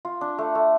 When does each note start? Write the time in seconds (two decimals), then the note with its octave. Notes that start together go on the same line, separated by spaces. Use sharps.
0.05 F4
0.21 D4
0.38 A3
0.55 A3